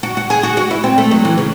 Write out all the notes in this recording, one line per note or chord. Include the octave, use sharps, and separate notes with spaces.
F#4
F#4
G#4
F#4
F#4
E4
C4
A3
F#3
E3
C#3